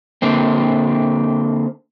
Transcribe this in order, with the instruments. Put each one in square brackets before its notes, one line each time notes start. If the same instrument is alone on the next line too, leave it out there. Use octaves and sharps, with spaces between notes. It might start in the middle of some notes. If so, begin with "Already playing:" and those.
[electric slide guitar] D3 A#3 C4